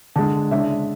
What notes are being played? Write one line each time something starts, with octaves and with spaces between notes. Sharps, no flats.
D3 G#3 D4 A5
C#3 G#3 D4 E5